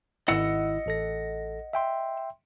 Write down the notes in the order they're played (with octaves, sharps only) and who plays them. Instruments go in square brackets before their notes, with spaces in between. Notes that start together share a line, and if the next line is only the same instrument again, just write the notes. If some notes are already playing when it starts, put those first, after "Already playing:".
[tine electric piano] G#1 E4 [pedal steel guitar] D#5 F#5 E6
[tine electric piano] A1 A4 A#6
E5 G5 C6